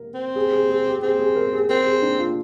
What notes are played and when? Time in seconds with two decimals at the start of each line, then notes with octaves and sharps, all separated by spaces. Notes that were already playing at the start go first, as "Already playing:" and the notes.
Already playing: A#4
0.14 C4
0.36 G#4
0.52 G#4
0.69 G#4
0.86 G4
1.02 C4 G#4
1.19 G#4
1.36 A#4
1.53 G#4
1.69 C4 A#4
1.86 G#4
2.02 D4
2.19 F4